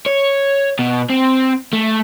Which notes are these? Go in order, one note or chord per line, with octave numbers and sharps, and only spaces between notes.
C#5
B2
C4
A3